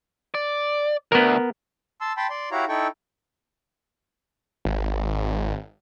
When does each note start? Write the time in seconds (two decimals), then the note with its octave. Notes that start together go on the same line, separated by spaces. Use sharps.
0.34 D5
1.12 D2 B3 A#4
2.00 A5 C6 E6
2.17 G5 A5 B5 C6
2.30 D5 C6
2.52 E4 F#4 G4 C#5 F5 A#5
2.69 D#4 E4 A4 G5 C#6
4.65 G#1